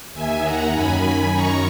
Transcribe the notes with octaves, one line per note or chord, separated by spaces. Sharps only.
D#2 D#3 E5 G#5
F#5 A#5
F#2 D#3 G#5 B5
F#2 D#3 A#5 C#6